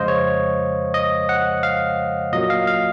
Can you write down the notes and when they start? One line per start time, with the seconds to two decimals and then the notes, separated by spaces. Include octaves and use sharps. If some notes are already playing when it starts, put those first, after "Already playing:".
Already playing: F2 C#3 F3 G#3 C5 D#5 F5
0.08 C#5
0.94 D#5
1.29 F#5
1.63 F5
2.33 A#2 F#3 A#3 D#5
2.50 F5
2.67 F5